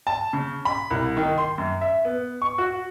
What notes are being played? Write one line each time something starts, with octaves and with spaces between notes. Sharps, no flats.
A5
C#3
B5
C2
D#3
C6
F#2
E5
B3
C#6
F#4